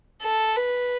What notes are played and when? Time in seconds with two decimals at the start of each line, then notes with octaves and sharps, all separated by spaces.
0.22 A4
0.56 B4